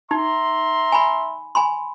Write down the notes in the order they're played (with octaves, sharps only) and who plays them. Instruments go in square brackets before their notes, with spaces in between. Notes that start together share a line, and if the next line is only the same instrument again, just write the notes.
[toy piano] D#4 [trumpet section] E5 A#5 C6
[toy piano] G#5 B5
G#5 B5 C6